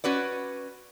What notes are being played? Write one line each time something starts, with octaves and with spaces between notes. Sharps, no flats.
C#4 F#4 B4 D5